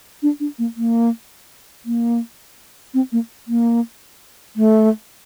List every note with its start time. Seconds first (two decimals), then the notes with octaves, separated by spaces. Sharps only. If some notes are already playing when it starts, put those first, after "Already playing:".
0.23 D4
0.40 D4
0.59 A#3
0.77 A#3
1.85 A#3
2.94 C4
3.12 A#3
3.48 A#3
4.56 A3